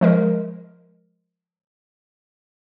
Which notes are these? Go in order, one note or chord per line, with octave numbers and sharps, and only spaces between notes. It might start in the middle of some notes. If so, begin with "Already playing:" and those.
F3 G#3 A#4 D#5